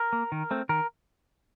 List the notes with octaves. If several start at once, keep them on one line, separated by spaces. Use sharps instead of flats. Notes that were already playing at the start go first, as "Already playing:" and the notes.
Already playing: A#4
A#3
D#3
A3 C4
D#3 A#4